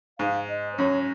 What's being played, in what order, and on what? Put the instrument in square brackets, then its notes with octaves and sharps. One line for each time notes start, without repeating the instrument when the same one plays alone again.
[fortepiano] G#2 [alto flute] F5
[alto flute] D#5
C5
[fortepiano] F#2 [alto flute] C#5